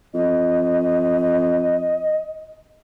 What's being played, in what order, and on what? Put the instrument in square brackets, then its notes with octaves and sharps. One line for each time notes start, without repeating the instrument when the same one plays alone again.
[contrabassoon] F2 [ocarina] D#5